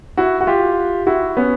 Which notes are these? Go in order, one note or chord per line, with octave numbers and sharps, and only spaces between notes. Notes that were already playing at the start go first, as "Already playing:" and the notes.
E4 F#4
F#4
F4 G4
E4 F#4
B3 C#4